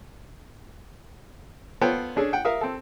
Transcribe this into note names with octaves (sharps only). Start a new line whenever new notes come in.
B3 F4 A4 C5 C#5 G5
C#4 D4 G#4 A4
F#5 G5
A#4 E5 F5 D#6
C4 A4